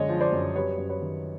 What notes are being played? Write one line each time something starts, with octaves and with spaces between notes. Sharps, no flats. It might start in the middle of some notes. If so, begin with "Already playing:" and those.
Already playing: F#2 D3 G#3 C#5 D#5
F3
C5 D5
F#2
G3 B4 C#5
F#2
B4 C#5
D#3